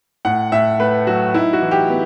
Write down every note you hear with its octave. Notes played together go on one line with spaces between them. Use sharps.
A2 F#5
A2 E5
A3 B4
F#3 F#4
D#4 E4
F#4
E3
G4
B3